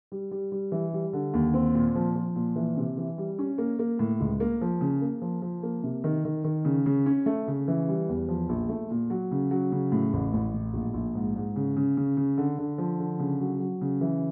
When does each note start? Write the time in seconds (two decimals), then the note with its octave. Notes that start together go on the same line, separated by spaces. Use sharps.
0.12 G3
0.31 G3
0.52 G3
0.72 E3
0.93 G3
1.13 D3
1.34 D#2
1.54 C4
1.75 A#2
1.95 F3
2.15 F3
2.36 A#2
2.56 E3
2.77 C3
2.97 E3
3.18 G3
3.39 C#4
3.58 A#3
3.79 A#3
3.99 A2
4.20 C#2
4.40 A#3
4.61 F3
4.81 C#3
5.02 A#3
5.22 F3
5.42 F3
5.63 A#3
5.83 C3
6.04 D#3
6.25 D#3
6.44 D#3
6.65 C#3
6.86 C#3
7.06 C#4
7.26 A3
7.48 C#3
7.68 E3
7.88 G3
8.09 E2
8.29 F3
8.49 A#1
8.69 A3
8.91 A#2
9.10 F#3
9.31 C#3
9.51 F#3
9.72 C#3
9.92 A2
10.13 A1
10.33 A1
10.53 A2
10.74 A#1
10.94 A#1
11.15 G#2
11.36 G#2
11.56 C#3
11.77 C#3
11.97 C#3
12.17 C#3
12.38 D3
12.58 D3
12.78 F3
12.99 D3
13.20 C#3
13.40 F#3
13.60 F#3
13.81 C#3
14.01 E3